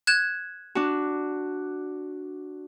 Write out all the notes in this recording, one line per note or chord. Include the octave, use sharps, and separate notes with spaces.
F#6 G#6 E7
D4 F#4